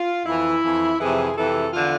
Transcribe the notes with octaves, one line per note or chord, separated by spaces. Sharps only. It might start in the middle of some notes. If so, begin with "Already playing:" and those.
Already playing: F4
F2 E3 E4
F2 E3
F2 C3 E3 G#4
F2 C3 E3 A4
E2 D3 F4